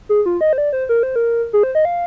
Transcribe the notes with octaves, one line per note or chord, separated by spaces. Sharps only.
G#4
F4
D#5
C5
D5
C5
A#4
C5
A#4
G#4
C5
D#5
F5